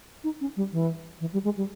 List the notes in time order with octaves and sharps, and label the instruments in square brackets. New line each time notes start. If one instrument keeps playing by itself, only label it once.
[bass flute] D#4
C#4
G3
E3
E3
G3
G#3
G3